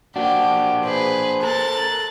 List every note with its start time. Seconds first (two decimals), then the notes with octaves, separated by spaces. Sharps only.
0.16 A#3 D4 F#4 G4
0.84 G#4 B4 C5
1.43 A4 A#4 F#6 A6